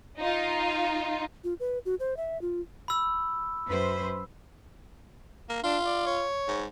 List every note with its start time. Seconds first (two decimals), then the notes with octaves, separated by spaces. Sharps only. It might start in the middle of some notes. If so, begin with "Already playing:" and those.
0.19 D#4 F4
1.44 F4
1.60 B4
1.86 F#4
2.00 C5
2.17 E5
2.42 F4
2.88 B5 E6
3.67 F#2 B4 C5
5.49 A#3
5.63 D4 F4
5.85 D5
6.06 C#5
6.48 G#2